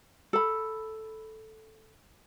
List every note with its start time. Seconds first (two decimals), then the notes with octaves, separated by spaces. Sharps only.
0.33 A4 B5